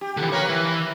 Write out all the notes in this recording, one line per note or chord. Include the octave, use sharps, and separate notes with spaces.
G4
D3 E3
A#3 A#4 B4 C#5
E3